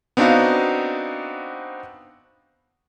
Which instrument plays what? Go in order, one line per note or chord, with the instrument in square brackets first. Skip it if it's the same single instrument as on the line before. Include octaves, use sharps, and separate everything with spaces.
[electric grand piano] B3 C4 D4 D#4 F#4 F5